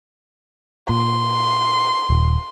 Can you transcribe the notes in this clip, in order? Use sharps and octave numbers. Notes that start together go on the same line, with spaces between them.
A#2 C6
D#1